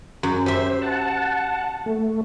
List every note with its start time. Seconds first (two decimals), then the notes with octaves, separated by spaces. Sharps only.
0.23 F#2
0.46 G4 C5 E5
0.82 F#5 A5
1.86 A3